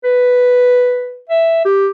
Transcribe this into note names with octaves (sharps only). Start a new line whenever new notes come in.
B4
E5
G4